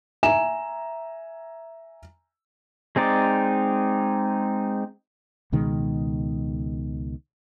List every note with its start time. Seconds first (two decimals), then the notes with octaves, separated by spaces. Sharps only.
0.23 E5 G#5 A#5 E7
2.96 G#3 C4 D#4 D5
5.52 C#2 B2 D#3 G#3